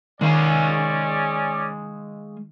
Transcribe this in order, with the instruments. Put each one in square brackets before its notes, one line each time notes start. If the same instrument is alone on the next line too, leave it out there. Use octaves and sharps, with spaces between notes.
[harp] D#3 C7 [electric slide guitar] G#3 F5 G#5 [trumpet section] C#4 D5